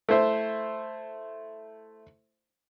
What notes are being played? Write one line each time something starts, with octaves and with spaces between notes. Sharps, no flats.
A3 E4 C5 E5